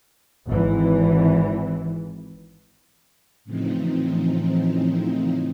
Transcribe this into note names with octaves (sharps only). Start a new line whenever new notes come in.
G#1 E3
A2 C#3 E3 F3 C4 D#4